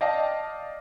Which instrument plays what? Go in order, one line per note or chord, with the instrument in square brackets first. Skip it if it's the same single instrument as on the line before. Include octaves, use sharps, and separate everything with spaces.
[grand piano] D5 D#5 F5 G5 A5